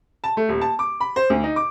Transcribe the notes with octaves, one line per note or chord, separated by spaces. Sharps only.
A5
A3
D#1
A5
D6
B5
C5
D2
D#4
D6